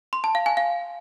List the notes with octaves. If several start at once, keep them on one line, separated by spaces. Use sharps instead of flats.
C6
A5
F5
G#5
F5